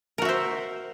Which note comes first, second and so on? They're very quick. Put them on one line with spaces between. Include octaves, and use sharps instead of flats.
A#4 F#4 E5 C5